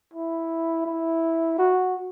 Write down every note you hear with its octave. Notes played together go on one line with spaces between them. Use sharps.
E4
E4
F#4